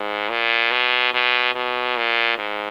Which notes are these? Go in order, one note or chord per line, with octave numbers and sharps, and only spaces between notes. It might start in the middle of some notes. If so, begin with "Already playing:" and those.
Already playing: G#2
A#2
B2
B2
B2
A#2
G#2